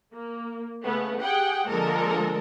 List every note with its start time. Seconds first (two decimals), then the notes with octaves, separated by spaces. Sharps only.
0.13 A#3
0.84 C#3 A3 B3
1.22 G4 G#4 F#5 G5
1.69 D3 F3 G#3 A#3 A4 A#4